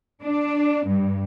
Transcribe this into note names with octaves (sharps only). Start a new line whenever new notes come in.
D4
G2